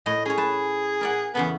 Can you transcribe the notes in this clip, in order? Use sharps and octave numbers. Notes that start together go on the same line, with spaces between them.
A2 D#5
C#4 G#4 C#5
B4 A5
A#4 D5 F#5
E2 C#3 B3 A4